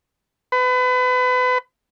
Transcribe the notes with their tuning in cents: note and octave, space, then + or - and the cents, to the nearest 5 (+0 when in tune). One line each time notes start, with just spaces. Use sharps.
B4 +30